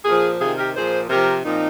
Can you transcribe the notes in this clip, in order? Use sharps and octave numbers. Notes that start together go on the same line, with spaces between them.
A#2 F3 F4 G#4
C3 D#3 F4 G#4
G4 A#4
A#2 F3 G#4 C5
C3 F3 G4 A#4
A#2 F3 C4 D#4